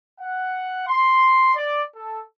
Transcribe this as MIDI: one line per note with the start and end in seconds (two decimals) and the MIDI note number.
0.20 0.85 78
0.86 1.52 84
1.55 1.82 74
1.95 2.20 69